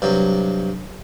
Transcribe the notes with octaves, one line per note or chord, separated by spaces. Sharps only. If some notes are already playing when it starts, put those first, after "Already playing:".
G2 C3 F#3